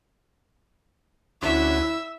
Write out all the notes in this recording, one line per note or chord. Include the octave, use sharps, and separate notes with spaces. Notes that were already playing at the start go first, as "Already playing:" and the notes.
D2 C#4 E4 F#4 E5
E6